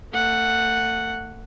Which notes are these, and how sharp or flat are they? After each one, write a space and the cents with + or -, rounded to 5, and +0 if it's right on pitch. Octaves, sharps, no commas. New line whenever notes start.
A3 +35 F#5 +0